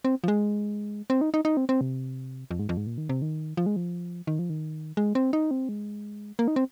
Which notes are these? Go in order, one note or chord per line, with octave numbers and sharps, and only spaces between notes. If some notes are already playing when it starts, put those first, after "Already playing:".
C4
F3
G#3
C4
D#4
D#4
D#4
C4
C4
C3
F2
G#2
F2
G#2
A#2
D#3
C3
D#3
F3
G#3
F3
D#3
F3
D#3
G#3
C4
D#4
C4
G#3
A#3
D#4
C4